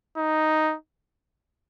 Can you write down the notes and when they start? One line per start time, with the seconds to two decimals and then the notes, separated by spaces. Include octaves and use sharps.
0.17 D#4